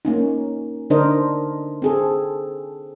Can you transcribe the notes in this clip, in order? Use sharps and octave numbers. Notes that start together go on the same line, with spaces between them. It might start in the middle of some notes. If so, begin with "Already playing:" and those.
A#3 C#4 D#4
D3 D4 D#4 A#4 C5 D#5
C4 G#4 A4